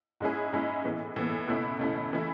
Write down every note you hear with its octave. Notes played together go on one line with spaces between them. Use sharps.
G#2 G#3 C#4 E4 G#4
G#2 G#3 C#4 E4 G#4
A2 E3 B3
A2 E3 B3
C#2 B2 A3 C#4 E4
C#2 B2 A3 C#4 E4
C#3 E3 A3 E4